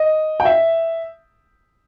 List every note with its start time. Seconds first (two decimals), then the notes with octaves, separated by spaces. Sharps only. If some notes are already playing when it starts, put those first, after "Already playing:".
Already playing: D#5
0.40 G5
0.45 E5